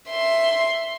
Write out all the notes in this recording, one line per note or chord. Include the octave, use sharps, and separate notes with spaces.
E5 C6